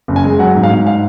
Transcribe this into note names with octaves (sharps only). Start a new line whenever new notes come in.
F#1
G#5
G#3
F#3 F#5
G#2
F5
G#2
F5